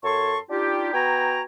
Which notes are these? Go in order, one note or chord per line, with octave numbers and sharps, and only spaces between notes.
F#2 A4 C#5 A5 C6 C#6
D4 D#4 F4 G4
B3 F#4 G5 G#5 A#5